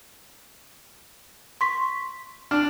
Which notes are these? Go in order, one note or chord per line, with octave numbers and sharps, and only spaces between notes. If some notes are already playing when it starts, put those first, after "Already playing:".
C6 C#6 B6
D4 F6